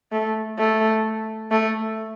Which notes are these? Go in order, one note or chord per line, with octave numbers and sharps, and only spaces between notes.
A3
A3
A3